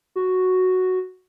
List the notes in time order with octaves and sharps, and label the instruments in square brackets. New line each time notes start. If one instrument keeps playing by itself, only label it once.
[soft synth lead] F#4